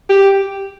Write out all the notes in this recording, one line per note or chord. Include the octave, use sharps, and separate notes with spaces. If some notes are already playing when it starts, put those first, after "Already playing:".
G4